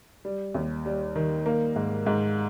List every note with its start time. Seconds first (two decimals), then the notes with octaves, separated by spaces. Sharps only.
0.25 G3
0.55 D#2
0.86 G3
1.16 D#3
1.46 A#3
1.76 G#2
2.06 G#2